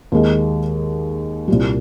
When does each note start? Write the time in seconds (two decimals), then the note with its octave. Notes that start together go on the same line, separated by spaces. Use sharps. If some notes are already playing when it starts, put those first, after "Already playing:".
0.12 D#2 D#3 G#3 D#4
1.48 C2 A#2 G3